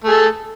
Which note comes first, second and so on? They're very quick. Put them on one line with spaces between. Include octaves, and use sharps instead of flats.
A3 G#4 A4